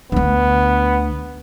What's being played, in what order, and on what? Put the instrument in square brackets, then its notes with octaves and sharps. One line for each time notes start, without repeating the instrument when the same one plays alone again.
[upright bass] D2 D3 [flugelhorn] B3